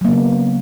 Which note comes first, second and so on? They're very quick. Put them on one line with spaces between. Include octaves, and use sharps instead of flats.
F#3 A#3 C#3 B3